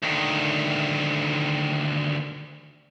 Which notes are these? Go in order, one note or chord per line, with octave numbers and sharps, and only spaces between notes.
D2 D#3